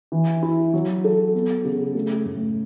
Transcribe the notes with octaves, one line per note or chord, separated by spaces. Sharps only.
E3
E4
F#3
A4
B3
C#3
A3
A2